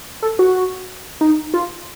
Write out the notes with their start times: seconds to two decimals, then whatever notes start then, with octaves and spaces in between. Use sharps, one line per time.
0.22 A4
0.39 F#4
1.21 D#4
1.54 F4